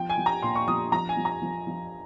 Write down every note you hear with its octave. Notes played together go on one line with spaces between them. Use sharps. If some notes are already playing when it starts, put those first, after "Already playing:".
Already playing: F3 G5
G#5
F3
A#5
A#2 C6
C#6
F3 D#6
F3 A#5
G#5
F3
A#5
F3
F3